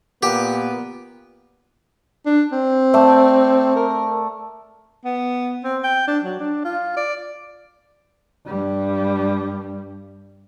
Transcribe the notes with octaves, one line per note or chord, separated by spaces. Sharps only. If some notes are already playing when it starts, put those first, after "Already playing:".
A#2 B3 G4
D4
C4
A3 A4 D5
A#4
B3
C4
G5
D4
F#3
D4
F4
D5
G2 G3